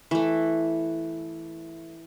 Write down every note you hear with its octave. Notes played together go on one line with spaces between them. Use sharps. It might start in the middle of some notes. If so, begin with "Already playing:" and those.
E3 A3